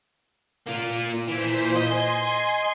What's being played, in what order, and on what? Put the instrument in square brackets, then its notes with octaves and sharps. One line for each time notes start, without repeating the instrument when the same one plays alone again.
[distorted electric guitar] A#3 F4
[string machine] A#2 C5 B6 [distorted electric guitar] E3
[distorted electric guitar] D#5 [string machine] G#5 C6